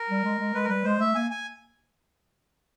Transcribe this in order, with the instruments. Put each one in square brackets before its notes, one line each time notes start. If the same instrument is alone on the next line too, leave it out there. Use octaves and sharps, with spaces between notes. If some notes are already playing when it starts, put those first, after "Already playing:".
Already playing: [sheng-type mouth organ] A#4
[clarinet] G3
G#3
G#3
[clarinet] G#3 [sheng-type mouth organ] B4
[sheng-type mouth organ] A#4
[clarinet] G3 [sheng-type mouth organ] B4
[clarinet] G#3 [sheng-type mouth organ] C5
[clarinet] A3 [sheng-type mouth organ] E5
[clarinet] A#3 [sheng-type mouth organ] G#5
[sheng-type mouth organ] G#5